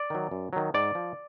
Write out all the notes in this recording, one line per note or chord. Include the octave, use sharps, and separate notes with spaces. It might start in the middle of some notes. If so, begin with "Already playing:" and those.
Already playing: D5
D#3 F#3
F#2
D#3 F#3
G#2 D5
F3